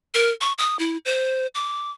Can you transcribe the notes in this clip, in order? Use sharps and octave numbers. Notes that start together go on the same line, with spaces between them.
A#4
C#6
D#6
E4
C5
D6